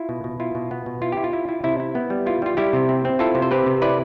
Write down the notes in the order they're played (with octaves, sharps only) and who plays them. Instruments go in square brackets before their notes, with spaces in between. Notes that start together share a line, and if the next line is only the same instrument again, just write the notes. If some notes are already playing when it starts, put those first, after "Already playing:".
Already playing: [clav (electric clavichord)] E4 F4
B2
B2
E4 F4
B2
B3
B2
E4 F4
E4 G4
F4
E4
E4
C3 E4
E4
B3
G3
E4 F4
G3 F4
G3 E4 G4
C3
C4
C4
E4 F4 A4
C3
C5
C4 G4 B4
C3
E4 B4 D5